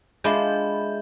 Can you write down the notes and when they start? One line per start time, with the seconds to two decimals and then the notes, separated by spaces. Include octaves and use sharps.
0.24 G#3 D4 F4 E5 B5 G6